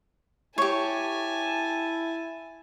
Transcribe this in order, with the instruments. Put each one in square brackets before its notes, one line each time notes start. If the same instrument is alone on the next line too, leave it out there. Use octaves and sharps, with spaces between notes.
[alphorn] E4 [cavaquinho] G4 C#5 [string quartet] G#5 A5